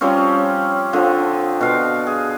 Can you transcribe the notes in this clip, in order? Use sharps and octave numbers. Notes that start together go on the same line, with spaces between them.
F3 G3 C4 C#4
D3 F3 C4
B2 F5
G#4